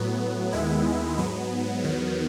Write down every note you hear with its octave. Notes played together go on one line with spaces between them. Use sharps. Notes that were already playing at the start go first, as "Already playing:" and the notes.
Already playing: A2 F#3 B3
D#2 D#3 G#3 B3 E4
G#2 F#3 B3
E2 D#3 F#3 B3